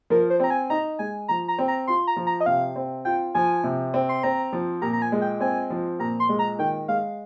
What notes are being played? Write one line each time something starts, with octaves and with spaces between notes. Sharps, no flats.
F3 A#4
C5
C4 A#5
G#5
D#4 A#5
G#3 G#5
F3 A#5
A#5
C4
A#5
F4 C6
A#5
F3
A#5
D#5
C3 F5
C4
F4 G5
F3 G#5
C3
C4
C6
C4 A#5
F3
A#2 A#5
A#5
G#5
G#3
G5
C4 G#5
F3
A#2 A#5
C6
G#3
A#5
D#3 G5
G#3 F5